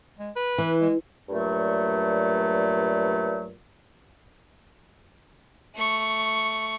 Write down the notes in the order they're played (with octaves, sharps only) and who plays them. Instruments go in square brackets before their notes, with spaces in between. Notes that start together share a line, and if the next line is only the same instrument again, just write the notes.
[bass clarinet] G#3
B4
[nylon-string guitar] E3
[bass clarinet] G#3
[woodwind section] G2 A#2 F#3 A3
[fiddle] A3 C#6